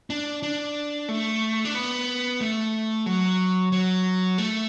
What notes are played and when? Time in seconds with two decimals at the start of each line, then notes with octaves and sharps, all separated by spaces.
0.10 D4
0.43 D4
1.09 A3
1.65 D4
1.75 B3
2.41 A3
3.06 F#3
3.72 F#3
4.38 A3